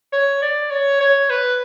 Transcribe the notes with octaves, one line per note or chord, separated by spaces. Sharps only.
C#5
D5
C#5
C#5
B4